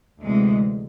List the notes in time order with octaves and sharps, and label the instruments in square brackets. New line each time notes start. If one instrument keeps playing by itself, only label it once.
[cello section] D2 C3 E3 G#3